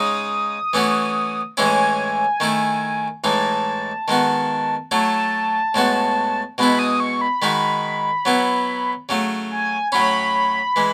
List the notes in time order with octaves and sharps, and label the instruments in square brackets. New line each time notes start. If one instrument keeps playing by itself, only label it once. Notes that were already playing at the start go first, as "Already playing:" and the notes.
Already playing: [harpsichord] C#3 G#3 D#4 [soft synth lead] D#6
[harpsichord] E3 A3 C#4 F#4
[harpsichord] A2 E3 G#3 C#4 E4 [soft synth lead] G#5
[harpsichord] D#3 A3 E4
[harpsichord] A2 E3 G#3 D#4 [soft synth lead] A5
[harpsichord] D#3 G#3 B3 F#4
[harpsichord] F#3 A3 E4 [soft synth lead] A5
[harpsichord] A2 G#3 B3 F#4
[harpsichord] B2 G#3 B3 E4 [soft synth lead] B5
[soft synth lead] D#6
C#6
B5
[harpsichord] D#3 G#3 D#4 F#4
F#3 B3 E4
C#3 F#3 A3
[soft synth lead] G#5
[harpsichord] A2 F#3 C#4 [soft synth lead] B5
[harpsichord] E3 G#3